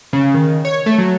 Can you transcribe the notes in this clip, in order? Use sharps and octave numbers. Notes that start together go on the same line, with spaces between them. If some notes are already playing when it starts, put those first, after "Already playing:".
C#3
D#3
C#5
A3
F#3